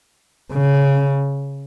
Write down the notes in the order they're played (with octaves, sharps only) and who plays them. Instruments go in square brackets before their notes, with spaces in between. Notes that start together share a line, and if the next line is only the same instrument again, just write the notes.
[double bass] C#3